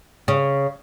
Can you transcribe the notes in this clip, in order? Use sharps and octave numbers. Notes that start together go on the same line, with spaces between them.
C#3